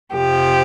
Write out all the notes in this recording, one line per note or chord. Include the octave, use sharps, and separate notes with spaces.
F2 C3 F3 G4